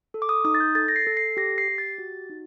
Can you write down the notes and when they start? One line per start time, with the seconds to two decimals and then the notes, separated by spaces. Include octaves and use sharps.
0.14 A4
0.22 D6
0.29 D#6
0.45 D#4 D#6
0.55 A6
0.60 G6
0.75 A4 A6
0.88 A#6
0.96 C7
1.07 A4
1.17 C7
1.37 G4 A#6
1.58 C7
1.68 G4
1.78 A6
1.98 F#4
2.30 D#4